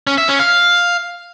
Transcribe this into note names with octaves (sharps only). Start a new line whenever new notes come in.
C#4
E5
C#4
F5